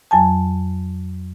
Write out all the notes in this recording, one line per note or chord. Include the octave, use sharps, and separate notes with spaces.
F2 F#3 G#5 A5